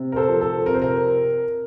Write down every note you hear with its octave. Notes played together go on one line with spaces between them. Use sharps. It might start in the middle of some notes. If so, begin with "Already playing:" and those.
Already playing: C3
A#4
A4 C5
F3
A4
C3 A#4
C5
A#4